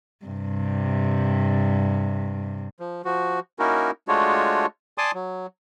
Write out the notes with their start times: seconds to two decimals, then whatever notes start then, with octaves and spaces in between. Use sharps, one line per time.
0.25 G2 C3
2.80 F3
3.05 F3 F#4
3.59 A#3 C#4 D#4 E4 F#4 A#4
4.08 G#3 A3 D4 F4 F#4 C#5
4.98 D5 G#5 A5 C6 D6 D#6
5.15 F#3